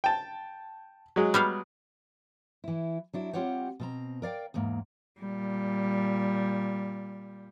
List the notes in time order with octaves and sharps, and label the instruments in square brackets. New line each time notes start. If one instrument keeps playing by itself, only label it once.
[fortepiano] G5 A5
F#3 G#3
[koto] G3 B3 F5
[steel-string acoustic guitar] E3 E4
F#3 D4 E4
G3 C4 F4 G4 C#5 F#5
B2 C4 A#5
A#4 D5 F5 G5
E2 G#2 A#3
[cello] A#2 G3